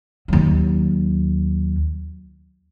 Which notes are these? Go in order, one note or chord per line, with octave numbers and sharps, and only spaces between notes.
D#2 F#3